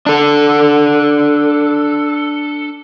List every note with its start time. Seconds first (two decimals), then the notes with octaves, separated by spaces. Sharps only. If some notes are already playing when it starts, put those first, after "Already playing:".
0.06 D4 A4